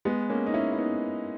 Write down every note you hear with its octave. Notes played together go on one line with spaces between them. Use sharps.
G#3 B3
A#3 C#4
D#4
C#4 E4
E4
B3 D#4